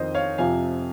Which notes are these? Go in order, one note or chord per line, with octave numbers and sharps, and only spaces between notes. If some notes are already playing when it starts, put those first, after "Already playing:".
Already playing: F2 D#3 C5 D#5
C#5 F5
F2 C3 F3 F5 G#5